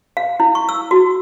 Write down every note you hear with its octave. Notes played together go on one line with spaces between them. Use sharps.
F5
E4
C#6
E6
F#4